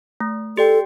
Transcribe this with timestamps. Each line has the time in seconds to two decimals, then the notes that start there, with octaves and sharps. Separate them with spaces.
0.21 A3
0.57 G4 A4 D5 G5